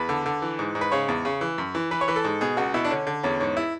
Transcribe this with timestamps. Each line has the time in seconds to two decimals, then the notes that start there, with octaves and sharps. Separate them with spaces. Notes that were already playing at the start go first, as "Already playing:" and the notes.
Already playing: E2 B4
0.09 D3
0.26 D3
0.42 E3
0.59 G#2
0.75 G#2
0.81 B4
0.92 C#3 C#5
1.08 E2
1.25 C#3
1.41 E3
1.58 F#2
1.75 E3
1.91 E3 B4
2.01 C#5
2.08 E3 B4
2.16 A4
2.24 G#2
2.41 B2 G#4
2.57 C#2 F#4
2.74 B2 E4
2.84 D4
2.90 D3 C#4
3.07 D3
3.23 E2 C#4
3.40 G#2 C#4
3.57 E4